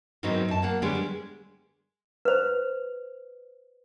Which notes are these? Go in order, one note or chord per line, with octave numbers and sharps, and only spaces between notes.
G#2 D#3 F#3 B3 C4 D#4
F#2 A5
F#3 A#3 F#5
D3 G3 G#3 B3 C#4 G4
G#3
B4 C5